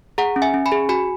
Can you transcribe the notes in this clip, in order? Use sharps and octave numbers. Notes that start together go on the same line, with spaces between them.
G#4 F#5 A#5
C#4
E5 G#5
C#4
G#5 B5
G#4
F#4 G#5 B5